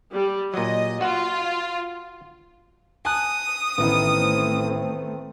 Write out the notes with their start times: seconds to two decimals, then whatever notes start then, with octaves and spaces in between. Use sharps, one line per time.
0.14 G3
0.54 A#2 F#3 D#5
1.01 F4 F#4 F#5
3.05 G#5 A5 D#6 F#6
3.78 A1 D#3 A3 B3 C4 E4